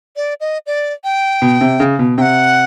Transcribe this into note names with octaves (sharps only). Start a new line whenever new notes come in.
D5
D#5
D5
G5
B2
C3
C#3
B2
C3 F#5 G5